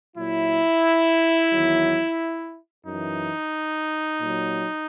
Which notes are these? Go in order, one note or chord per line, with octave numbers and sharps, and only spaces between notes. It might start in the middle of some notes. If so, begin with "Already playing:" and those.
A#2 F#3 E4
E2 D#3 F#3
F#2 E3 D#4
A#2 F#3